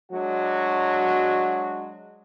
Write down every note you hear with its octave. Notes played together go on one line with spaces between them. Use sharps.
F#3 G#3 D4 F#4